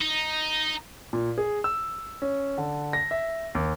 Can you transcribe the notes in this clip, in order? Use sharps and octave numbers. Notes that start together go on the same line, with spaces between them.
D#4
A#2
G#4
E6
C#4
D3
A#6
E5
D#2